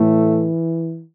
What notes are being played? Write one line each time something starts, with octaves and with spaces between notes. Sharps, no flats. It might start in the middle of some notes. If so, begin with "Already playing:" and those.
Already playing: A2 E3 A3